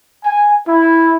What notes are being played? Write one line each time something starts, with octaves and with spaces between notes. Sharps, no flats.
G#5
E4